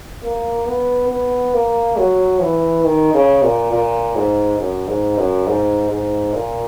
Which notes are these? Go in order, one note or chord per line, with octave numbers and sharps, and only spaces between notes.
A#3
B3
B3
A#3
F#3
E3
D#3
C#3
A#2
A#2
G#2
F#2
G#2
F#2
G#2
G#2
A#2